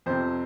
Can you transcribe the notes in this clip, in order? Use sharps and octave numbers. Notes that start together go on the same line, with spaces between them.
F2 C3 C5